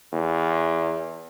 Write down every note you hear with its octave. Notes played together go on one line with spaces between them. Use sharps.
E2